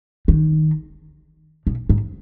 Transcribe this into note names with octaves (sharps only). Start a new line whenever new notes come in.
D#3
B2
G#2